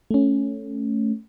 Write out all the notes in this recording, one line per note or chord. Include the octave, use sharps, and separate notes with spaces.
A3 C#4